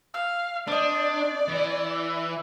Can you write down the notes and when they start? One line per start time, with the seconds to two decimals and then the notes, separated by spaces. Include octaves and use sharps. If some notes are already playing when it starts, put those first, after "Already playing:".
0.14 F5 E6
0.67 C4 D4 D5 D#5
1.48 E3